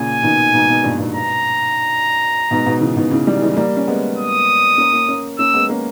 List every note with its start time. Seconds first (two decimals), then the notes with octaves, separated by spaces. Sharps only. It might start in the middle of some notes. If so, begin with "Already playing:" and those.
Already playing: A#2 C#3 G#5
0.23 B2 D#3
0.54 G#2 B2
0.69 G#2 B2
0.84 G2 A#2
0.99 G#2 B2
1.14 A#5
2.51 G#2 B2
2.66 G#2 B2
2.81 C#3 E3
2.97 B2 D#3
3.11 C#3 E3
3.26 D#3 G3
3.41 E3 G#3
3.57 G3 A#3
3.77 C#4
3.88 G#3 B3
4.18 D#6
4.78 A#3 C#4
4.93 A#3 C#4
5.09 A#3 C#4
5.38 A#3 C#4 E6
5.54 G#3 B3
5.69 A#3 C#4